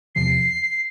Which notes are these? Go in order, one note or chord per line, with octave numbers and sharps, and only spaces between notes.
E2 C3 F3 C7